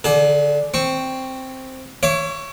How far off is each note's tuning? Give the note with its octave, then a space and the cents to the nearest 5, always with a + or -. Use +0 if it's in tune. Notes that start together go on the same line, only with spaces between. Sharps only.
D3 +0 G#4 +40
C4 +0 C#6 +0
C#5 +0 E5 +35 D6 -35